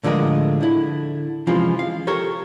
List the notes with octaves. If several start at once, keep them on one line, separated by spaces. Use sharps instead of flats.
A2 D3 F3 G#3 A#4 D#5
D3 E4
C3 E3 F3 G#3 C#4 F4
F5
G4 A4 A#4 C#5